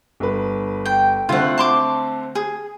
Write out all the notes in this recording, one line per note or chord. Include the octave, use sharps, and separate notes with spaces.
G1 B4
G5
D3 A3 C4 F4 F#5
A5 C6 D6
G#4